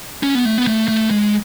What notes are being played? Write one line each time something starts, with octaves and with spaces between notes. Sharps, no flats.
C#4
B3
A3
B3
A3
A3
G#3